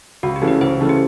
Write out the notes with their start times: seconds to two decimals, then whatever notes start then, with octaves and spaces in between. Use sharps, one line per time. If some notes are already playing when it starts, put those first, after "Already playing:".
0.23 C#2 F#4
0.36 G4
0.42 C#3 E3 A3 C#4
0.48 B4
0.61 C#2 C5
0.80 C#3 E3 A3 C#4
0.89 G4